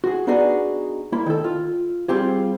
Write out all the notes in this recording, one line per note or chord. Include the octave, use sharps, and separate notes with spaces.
F#4 G#4
B3 D4 D#4 F#4 G#4
A#3 E4
D#3 A4
F4
G3 C4 F4 G4 G#4